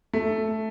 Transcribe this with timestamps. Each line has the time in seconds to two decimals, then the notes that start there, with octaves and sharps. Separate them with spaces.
0.13 A3